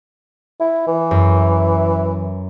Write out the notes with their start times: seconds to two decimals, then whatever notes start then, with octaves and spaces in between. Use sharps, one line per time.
0.60 E4
0.87 E3
1.11 F#2